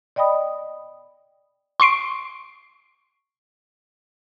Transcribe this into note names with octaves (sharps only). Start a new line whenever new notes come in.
D5 D#5 G5 B5 D#6
C6 C#6 C7 D7